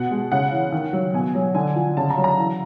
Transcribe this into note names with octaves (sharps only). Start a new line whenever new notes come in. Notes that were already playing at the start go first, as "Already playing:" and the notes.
Already playing: B2 F#5
G#3
C#3 F#5
E3
D#3
F#3
B2 G#5
F#3
D3 G#5
F3
C#3 A5
A#5
F#3
A#5
E3